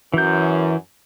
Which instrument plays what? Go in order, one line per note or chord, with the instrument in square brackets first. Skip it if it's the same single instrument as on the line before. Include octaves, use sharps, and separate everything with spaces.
[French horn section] F#2 [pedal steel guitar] E3 G6